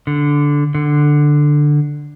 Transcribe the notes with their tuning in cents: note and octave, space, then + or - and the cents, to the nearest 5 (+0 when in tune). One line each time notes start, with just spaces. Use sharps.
D3 -10
D3 +10